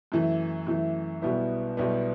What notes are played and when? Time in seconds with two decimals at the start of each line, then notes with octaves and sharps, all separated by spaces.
0.12 F#2 E3 A3
0.67 F#2 E3 A3
1.22 B1 B2 G3 B3 E4
1.77 B1 B2 G3 B3 E4